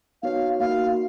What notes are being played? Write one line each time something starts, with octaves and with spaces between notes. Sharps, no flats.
B3 D#4 F#4 C#5 F5
A#3 D#4 F#4 F5